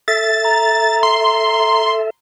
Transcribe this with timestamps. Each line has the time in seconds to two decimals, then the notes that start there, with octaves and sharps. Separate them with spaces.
0.08 A4 E5 A6
0.45 A#5
1.03 C6